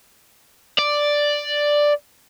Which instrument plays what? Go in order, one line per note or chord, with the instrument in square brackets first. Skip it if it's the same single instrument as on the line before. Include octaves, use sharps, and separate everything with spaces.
[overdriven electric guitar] D5